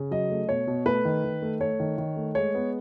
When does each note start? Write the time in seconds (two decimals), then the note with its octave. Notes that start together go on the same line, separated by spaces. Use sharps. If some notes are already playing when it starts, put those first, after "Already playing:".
Already playing: C#3
0.11 F#3 D#5
0.30 A3
0.49 B2 C#5
0.67 B2
0.86 A3 B4
1.05 D#3
1.24 D#3
1.42 A3
1.60 A3 C#5
1.80 D#3
1.98 D#3
2.16 A3
2.35 G#3 C#5
2.55 B3